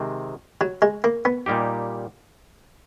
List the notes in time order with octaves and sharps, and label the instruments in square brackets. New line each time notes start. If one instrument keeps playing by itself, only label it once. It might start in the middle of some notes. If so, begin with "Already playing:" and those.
Already playing: [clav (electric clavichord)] C3 D#3 G#3 C4
[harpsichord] F#3
G#3
A#3
B3
[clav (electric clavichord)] A#2 G3 A#3 D#4 G4